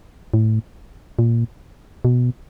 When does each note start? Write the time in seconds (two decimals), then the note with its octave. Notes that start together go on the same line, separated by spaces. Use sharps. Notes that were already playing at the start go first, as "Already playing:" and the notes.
0.34 A2
1.19 A#2
2.05 B2